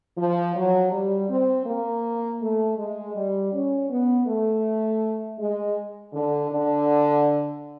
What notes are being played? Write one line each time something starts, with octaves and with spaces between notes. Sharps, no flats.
F3
F#3
G3
C4
A#3
A3
G#3
G3
C#4
B3
A3
G#3
D3
D3